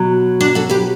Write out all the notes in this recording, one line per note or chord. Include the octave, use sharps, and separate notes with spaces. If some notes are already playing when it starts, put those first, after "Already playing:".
Already playing: B2 F#3
D4 F#4
F#4 A4
G4 B4